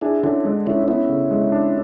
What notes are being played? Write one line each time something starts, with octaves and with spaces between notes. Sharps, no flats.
D4 E4 G#4
D3 C#4 E4
G#3
D3 C#4 E4
B3 C#4 E4
C#3
G#3
D4